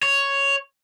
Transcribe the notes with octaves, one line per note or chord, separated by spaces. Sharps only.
C#5